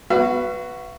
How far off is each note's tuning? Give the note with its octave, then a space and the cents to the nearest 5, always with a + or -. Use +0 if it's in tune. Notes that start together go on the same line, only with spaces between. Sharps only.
F#4 +0 B4 +0 F5 -45